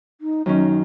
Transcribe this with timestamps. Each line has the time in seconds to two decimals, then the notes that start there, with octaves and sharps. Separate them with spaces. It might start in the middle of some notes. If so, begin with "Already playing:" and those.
0.21 D#4
0.46 F#2 D#3 C#4 D#4